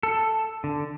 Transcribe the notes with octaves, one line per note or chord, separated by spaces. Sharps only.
A4
D3